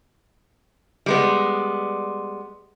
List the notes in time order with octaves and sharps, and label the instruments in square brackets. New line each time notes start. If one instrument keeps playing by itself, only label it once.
[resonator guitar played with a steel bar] G3 G#3 B3